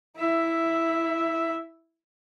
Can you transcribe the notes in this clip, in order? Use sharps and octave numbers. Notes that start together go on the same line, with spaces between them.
E4 E5